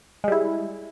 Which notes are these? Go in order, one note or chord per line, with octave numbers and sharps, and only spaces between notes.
G3 G#3 E4